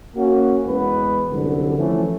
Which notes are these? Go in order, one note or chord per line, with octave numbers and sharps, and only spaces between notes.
A#3 C#4 F#4
E2 G#3 B3 B4
C2 F#2 D3
E3 F3 A3 C#4